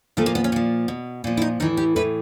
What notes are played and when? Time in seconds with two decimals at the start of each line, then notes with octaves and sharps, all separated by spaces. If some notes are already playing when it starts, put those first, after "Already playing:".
0.17 A#2 F3 A3
0.26 A#3
0.35 B3
0.44 C#4
0.52 A#2 F3
0.88 B2
1.24 A#2 F3
1.37 E4
1.42 D#4
1.60 A2 E3 D#4
1.77 G4
1.96 A2 E3 B4